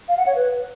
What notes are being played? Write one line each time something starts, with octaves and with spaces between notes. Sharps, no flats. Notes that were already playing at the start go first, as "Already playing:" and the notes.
F5
F#5
C#5
B4